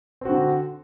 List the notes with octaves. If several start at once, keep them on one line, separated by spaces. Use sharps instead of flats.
D3 C4 F#4